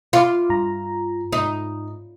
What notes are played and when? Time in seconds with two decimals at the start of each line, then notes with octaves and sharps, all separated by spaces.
0.13 F4 F5 D6
0.50 G2 A#5
1.33 G#2 D#4